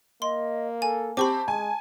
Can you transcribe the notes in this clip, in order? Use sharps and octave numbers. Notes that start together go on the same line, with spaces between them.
A#3 D#5 C6
A4 G#5
C4 G4 A5 B5 C#6 D6
G#3 G#5